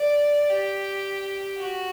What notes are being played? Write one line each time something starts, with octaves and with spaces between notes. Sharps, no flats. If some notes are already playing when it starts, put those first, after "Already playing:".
Already playing: D5
G4
F#4